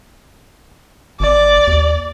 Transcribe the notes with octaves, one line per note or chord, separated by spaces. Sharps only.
G#1 D5
D#2